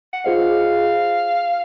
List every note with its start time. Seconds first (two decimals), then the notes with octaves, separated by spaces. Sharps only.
0.13 F#5
0.24 F4 G#4 C5 D#5 F5